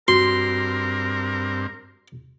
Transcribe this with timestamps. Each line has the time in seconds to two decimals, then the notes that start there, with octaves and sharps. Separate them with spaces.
0.08 G2 C4 F#4 A#4 C6